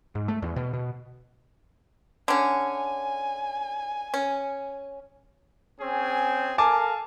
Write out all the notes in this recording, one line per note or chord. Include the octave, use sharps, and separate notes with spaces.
G#2
A3
E2
B2
B2
D3 C#4 G#5
C#4
C4 C#4 G#4
A4 A#4 F5 G#5 A5 D6